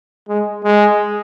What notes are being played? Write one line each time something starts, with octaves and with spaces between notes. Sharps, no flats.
G#3
G#3